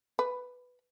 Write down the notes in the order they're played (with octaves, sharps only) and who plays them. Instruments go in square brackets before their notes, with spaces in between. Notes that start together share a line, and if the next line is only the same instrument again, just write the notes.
[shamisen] B4